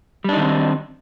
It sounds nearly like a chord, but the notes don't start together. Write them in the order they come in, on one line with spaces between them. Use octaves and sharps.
G3 D4 D#4 D#3 C4